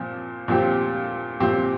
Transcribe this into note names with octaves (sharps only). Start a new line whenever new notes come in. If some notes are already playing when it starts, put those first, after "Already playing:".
Already playing: A#2 F3 C4
A#2 F3 C4 G4
A#2 F3 C4 G4